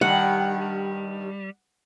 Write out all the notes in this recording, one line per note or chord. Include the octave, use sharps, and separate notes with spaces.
G2 D#3 G3 F#5